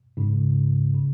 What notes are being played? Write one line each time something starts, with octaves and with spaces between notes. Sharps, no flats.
G#2 C#3
C#3